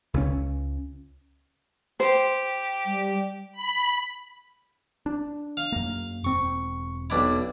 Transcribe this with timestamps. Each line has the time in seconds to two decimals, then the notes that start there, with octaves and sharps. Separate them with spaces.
0.14 C#2 C#3 C#4
2.00 G4 C5
2.86 G3
3.53 B5
5.06 D4
5.57 F5
5.72 F#2 A#3
6.24 E1 C4 C#6
7.10 B1 D4 E4